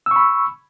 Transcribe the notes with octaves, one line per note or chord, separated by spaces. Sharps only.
B5 C#6 E6